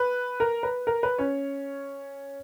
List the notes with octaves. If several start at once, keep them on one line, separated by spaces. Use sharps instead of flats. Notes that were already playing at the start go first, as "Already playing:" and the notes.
Already playing: B4
A#4
B4
A#4
B4
C#4 C#5